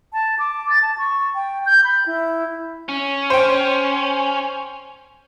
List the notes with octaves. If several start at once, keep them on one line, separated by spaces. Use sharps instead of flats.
A5
D6
A6
A5
C#6
G5
G6
B5
E4
C#4
C5 G5